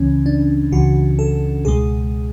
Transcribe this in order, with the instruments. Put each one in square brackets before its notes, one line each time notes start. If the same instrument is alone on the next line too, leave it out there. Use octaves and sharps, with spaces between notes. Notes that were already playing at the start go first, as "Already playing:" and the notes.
Already playing: [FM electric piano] C#2 C#3 E3 C#4
D4
C#2 C#3 E3 F#4
A4
C#2 B2 G#3 G#4